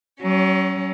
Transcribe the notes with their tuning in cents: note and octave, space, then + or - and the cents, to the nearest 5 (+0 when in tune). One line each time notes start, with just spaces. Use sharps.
F#3 +35 C#4 +0